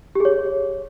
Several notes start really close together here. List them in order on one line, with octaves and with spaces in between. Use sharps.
G4 G#4 C#5